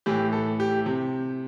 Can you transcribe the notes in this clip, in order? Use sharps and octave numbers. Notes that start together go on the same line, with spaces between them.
A2 E3 G4
A4
G4
C3